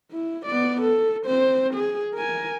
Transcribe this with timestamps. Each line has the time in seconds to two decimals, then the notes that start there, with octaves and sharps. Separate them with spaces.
0.12 E4
0.46 B3 D5
0.81 A4
1.26 C4 C5
1.74 G#4
2.15 A#4 G#5